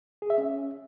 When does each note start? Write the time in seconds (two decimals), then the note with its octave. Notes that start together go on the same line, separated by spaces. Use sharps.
0.22 G#4
0.30 E5
0.38 C#4